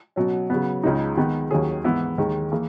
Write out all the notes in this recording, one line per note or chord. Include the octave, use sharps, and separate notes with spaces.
B2 F#3 C#4
C#3 F#3 B3
C#2 C#3 G#3 D#4
D#3 G#3 B3
D#2 D#3 F#3 C#4 G#4
G#2 E3 B3 E4
D#2 D#3 G#3
E3 A#3 E4 G#4